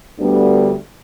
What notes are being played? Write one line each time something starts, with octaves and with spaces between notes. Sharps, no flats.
D2 D3 G3 B3